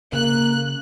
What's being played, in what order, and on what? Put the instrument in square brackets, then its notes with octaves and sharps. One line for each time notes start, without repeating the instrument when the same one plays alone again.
[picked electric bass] C#3 [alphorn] A#3 [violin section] F#6